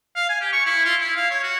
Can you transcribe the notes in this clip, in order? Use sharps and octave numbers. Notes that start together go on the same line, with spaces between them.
F5
G#5
G4
C#6
E4
F4
E4
F5
C#5
F#4